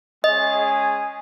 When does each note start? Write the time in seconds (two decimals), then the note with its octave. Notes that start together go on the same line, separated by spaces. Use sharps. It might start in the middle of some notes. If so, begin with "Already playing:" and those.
0.24 G#3 C#4 G#4 D#5